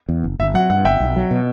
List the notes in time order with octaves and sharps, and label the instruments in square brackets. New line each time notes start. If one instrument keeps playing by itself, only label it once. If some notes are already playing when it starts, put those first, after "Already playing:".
[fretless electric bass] E2
F#1
[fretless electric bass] G1 [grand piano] E5
[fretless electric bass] F#3 [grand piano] F#5
[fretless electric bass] G2 [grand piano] F#5
[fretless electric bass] G1 [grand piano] E5 G5
[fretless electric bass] B1
F#3
B2